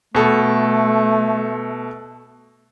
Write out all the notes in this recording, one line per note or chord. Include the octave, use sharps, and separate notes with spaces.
B2 A3 A4